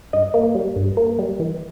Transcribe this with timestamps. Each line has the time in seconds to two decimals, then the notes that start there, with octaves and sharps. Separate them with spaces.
0.13 G2 D#5
0.34 A#3
0.55 G3
0.76 G2
0.97 A#3
1.19 G3
1.40 E3